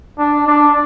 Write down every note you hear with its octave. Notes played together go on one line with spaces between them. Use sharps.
D4
D4